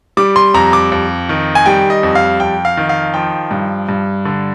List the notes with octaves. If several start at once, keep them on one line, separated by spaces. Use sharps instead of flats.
G3 D6
C6
F2 A#5
D6
F2
D#3
G#5
G3 G5
D#5
F2
F5
F2 G5
F5
D#3
F5
F3 G5
G2
G2
D3